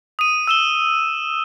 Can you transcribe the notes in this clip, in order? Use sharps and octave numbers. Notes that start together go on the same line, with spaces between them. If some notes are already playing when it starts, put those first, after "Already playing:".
D#6 D#7
E6 E7 G7